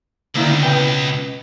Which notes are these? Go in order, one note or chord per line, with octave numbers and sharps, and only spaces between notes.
C#2 D3 A#3 E4
B2 B3 G5